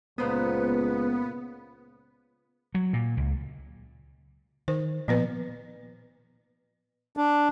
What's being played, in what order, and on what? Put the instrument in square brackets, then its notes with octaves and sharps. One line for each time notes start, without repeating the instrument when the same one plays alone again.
[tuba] C#2 [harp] A#2 C5 D#6 [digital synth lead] B3 [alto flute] B4
[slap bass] F#3
A#2
C#2
[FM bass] D#3 [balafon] C5
[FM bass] A#2 [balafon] F3 B3 B4
[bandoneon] D4